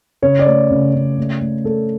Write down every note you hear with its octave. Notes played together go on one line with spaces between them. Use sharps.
C#3 C#5
D5
A3 C#5
C#3
C#3
A3
A3
A3 A4